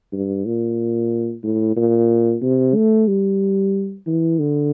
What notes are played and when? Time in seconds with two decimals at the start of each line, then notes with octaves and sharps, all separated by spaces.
0.13 G2
0.45 A#2
1.43 A2
1.76 A#2
2.42 C3
2.75 A3
3.08 G3
4.06 E3
4.39 D3